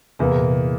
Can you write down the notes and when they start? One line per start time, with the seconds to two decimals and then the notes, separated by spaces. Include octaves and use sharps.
0.19 E2 C3 E3 A#3
0.32 A#2
0.44 C3